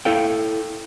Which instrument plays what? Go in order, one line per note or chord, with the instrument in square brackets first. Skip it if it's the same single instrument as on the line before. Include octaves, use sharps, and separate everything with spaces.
[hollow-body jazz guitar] E4 A4 F5 G5